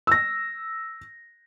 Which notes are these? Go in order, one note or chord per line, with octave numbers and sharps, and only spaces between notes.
E6 A#6